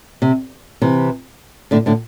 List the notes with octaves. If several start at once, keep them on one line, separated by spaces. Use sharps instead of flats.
C3
C3 E3
A2 D3
A2 D3